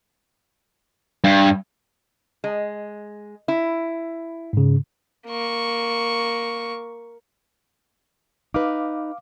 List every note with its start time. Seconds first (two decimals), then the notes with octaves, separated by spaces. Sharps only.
1.24 G2
2.44 G#3
3.48 E4
4.53 G#2 C#3
5.27 A#3 C#6
8.54 D#4 B4 F5 D6